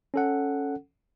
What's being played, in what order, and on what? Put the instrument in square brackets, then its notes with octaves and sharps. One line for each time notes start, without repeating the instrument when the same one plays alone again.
[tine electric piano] C#4 A4 F#5